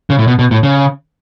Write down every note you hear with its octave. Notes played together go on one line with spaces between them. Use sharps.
C#3
A2
B2
B2
A2
C#3